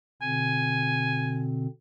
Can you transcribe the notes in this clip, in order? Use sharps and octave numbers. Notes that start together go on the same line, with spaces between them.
B2 D3 C4 G#5